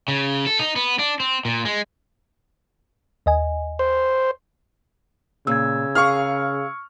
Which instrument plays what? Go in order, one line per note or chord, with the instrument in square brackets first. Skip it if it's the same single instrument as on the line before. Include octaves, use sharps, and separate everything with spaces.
[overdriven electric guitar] C#3
A4
D#4
B3
D4
C4
A#2
G#3
[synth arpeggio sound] D#2 D#5 G#5
[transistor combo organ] C5
[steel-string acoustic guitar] A#2 [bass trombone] C#3 [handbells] E6 G#6
[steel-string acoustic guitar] G#4 A#4 F5 [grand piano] C#6 F6